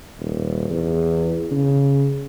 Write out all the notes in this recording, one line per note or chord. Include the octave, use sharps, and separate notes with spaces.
D#1
E2
C#3